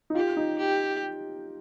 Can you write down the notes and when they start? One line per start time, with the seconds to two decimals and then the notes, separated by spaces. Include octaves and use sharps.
0.10 D#4
0.15 F4 G4
0.37 D#4
0.59 G4